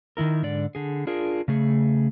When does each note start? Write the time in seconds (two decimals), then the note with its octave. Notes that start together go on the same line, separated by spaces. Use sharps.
0.17 D#3 E3 E4 A#4
0.42 G#2 D3 D5
0.75 D3 G#4
1.07 D4 F4 G#4 A#4
1.48 C#3 A3 G#4